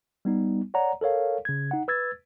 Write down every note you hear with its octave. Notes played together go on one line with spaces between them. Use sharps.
G3 B3 D#4
C#5 D5 F#5 A#5
A4 A#4 C#5 F5
C#3 G#6
D#4 F#5
B4 E6 G#6 A6